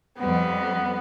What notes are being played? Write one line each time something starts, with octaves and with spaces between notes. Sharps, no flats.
F2 G3 B3